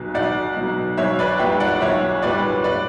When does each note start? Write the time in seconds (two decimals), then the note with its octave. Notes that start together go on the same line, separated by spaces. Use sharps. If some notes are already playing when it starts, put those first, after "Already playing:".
Already playing: B1 B2 F#3
0.14 B1 D5 F#5
0.57 B2 F#3
0.98 B1 C#5 E5
1.19 B4 D5
1.39 A#2 G3 E5 G5
1.60 D5 F#5
1.81 B1 C#5 E5
2.22 A#2 G3 B4 D5
2.64 B4 D5